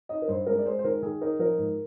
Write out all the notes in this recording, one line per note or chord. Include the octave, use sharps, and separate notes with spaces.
D#4 D#5
A#4
G2 C5
G#3 A#4
D5
G#3 C5
C5
D#3 A#4
D#3 G#4
D#4 A#4
F3 A#4
G#2